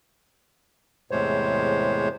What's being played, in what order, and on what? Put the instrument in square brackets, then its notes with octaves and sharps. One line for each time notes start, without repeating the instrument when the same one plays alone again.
[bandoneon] E2 A2 C3 G#3 C5 C#5